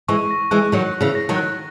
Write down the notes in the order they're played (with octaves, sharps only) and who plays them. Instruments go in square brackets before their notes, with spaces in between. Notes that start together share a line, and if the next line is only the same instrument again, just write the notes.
[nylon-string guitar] E3 G#3 [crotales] C#6
[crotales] A#6
[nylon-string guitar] E3 G#3 [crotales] F#6
[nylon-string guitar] D#3 F#3 [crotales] C#6
[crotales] C#6
[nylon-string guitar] C#3 E3
[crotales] A#6
[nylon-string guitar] D#3 F#3
[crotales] F#6